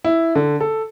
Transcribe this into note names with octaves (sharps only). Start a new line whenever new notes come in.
E4
D3
A4